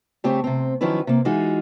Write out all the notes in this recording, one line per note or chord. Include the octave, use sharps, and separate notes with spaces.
C#3 A3 C4 G4 C#5
C3 C4
D#3 F3 F#3 C#4 E4 B4
C3 A#3
E3 G#3 D#4 F4 F#4 G#4